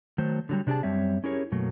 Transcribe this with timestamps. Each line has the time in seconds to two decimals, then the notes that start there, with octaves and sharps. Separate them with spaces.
0.18 D#3 F#3 A3 C5
0.49 D3 F#3 G3
0.67 C3 D4 G4 G#4 A5
0.83 F#2 G3 C4 C#5 E5
1.24 C#4 E4 G4 G#4 A#4 C#5
1.52 F#2 B2 F#3 A3 A#3